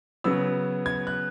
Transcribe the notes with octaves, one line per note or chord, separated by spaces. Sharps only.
C#3 F#3 B3 E6
G#6
F#6